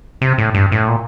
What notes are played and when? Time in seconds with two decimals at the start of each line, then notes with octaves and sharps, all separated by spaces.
0.22 C3
0.38 A2
0.55 G2
0.72 A2
0.88 A#2